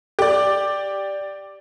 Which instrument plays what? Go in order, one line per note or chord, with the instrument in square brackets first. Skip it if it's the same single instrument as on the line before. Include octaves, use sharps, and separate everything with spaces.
[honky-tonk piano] G4 D5